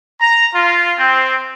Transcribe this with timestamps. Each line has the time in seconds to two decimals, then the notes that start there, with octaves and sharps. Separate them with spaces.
0.21 A#5
0.55 F4
0.99 C4